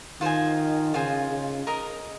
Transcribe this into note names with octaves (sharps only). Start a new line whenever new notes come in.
D#3 F4 C5 D#5 G#5
C#3 F4 C5 D#5 G#5
C#3
A#4 D#5 A#5